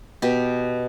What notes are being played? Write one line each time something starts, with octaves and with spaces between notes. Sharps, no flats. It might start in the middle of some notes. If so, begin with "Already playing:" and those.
B2 G4